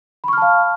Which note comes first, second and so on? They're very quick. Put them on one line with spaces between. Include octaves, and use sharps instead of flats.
B5 C#6 F6 A5 F5